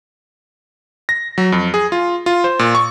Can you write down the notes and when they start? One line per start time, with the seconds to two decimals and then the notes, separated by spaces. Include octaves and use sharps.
1.09 A#6
1.38 F#3
1.52 F2
1.74 G#4
1.92 F4
2.26 F4
2.44 C5
2.59 A#2
2.75 C#6